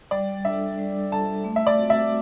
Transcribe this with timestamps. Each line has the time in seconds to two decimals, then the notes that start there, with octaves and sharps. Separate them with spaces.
0.11 G3 D5
0.45 D4 A4 E5
0.78 G3
1.12 D4 A4 A5
1.44 A3
1.56 E5
1.67 D5
1.78 C4 F#4
1.90 E5